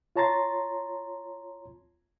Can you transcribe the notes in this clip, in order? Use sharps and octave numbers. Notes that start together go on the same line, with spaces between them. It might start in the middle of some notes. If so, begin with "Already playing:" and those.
F4 C#5 A5 A#5 C6 A6